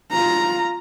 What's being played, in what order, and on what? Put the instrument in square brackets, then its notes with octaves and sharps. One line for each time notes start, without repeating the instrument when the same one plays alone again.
[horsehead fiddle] F4 A#5